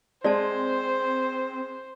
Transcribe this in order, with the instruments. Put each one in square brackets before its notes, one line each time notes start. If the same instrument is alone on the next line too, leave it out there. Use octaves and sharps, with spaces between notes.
[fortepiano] G#3 [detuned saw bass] C4 [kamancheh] C5 [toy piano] D5 A5